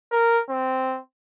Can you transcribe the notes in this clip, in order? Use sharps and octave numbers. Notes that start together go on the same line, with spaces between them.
A#4
C4